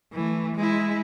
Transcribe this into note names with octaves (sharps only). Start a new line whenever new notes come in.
E3 A3
G#3 E4